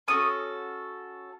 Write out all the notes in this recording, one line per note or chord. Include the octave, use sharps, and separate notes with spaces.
C#4 F#4 A4 D#6